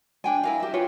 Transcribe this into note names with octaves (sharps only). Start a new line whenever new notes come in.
D4 G5 G#5
E4 A#4 F5
G4 E5
F4 G4 B4 C#5